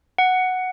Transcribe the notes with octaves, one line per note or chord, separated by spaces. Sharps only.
F#5